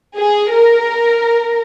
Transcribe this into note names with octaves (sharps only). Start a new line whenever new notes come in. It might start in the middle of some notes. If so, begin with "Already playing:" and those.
G#4
A#4